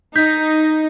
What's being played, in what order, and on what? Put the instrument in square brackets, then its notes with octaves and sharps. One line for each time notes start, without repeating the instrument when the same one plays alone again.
[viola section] D#4 [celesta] G6 B6